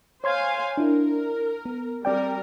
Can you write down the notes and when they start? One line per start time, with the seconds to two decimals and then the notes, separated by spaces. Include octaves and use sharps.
0.24 C5 C#5 F5 G#5 C6 G#6
0.77 D4 E4 A#4
1.65 B3
2.05 G3 C4 A#4 D5 G5